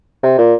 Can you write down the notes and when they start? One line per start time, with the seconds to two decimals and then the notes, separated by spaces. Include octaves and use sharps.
0.23 C3
0.38 A#2